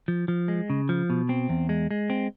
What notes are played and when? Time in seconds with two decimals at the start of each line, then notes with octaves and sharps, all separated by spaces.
0.08 F3
0.28 F3
0.48 G#3
0.70 C#3
0.89 F3
1.10 B2
1.29 C4
1.49 E2
1.69 G#3
1.91 G#3
2.10 C4